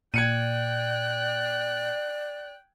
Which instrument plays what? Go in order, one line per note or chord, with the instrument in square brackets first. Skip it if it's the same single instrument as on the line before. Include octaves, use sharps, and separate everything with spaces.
[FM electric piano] A#2 [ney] D5 [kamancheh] G5 F#6 [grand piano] G#6 C#7 D#7